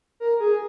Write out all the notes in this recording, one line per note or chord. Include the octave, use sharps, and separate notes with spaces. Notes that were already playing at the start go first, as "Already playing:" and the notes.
A#4
G#4